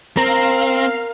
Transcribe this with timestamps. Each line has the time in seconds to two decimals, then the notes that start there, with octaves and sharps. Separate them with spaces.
0.17 C4 A#4 F5 A#5